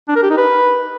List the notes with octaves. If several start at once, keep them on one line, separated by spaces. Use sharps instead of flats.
D4
A#4
G4
D#4
B4